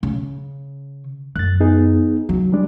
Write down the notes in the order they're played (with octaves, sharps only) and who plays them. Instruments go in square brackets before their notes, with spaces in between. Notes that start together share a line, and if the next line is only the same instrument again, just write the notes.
[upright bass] C#3
[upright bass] F#2 [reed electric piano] F#6 A6
[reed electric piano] B3 D#4 G#4
[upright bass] C#3 [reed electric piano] F#3
[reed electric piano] G3 G#3 D4